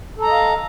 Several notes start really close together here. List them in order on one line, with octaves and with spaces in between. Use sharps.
A4 A#5 D#5 F5